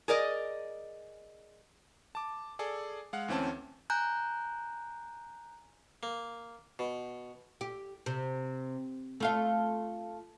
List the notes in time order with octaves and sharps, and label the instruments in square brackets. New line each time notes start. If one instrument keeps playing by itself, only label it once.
[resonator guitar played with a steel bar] G#4 A#4 D5 D#5
[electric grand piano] A5 D6
G#4 A4 D5
G#3 F5 F#5
D2 E3 C4 C#4 A5
[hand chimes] G#5 A#5 F#6 G6
[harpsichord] A#3
B2
[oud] G4
C3
A3 F4 F5